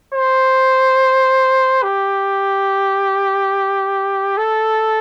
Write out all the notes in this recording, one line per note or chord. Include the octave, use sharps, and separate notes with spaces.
C5
G4
A4